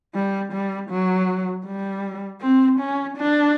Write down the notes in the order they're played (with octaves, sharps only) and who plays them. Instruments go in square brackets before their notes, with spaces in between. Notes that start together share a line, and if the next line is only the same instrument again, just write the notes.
[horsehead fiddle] G3
G3
F#3
G3
C4
C#4
D4